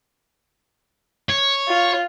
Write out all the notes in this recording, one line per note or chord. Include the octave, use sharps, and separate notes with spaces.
C#5
F4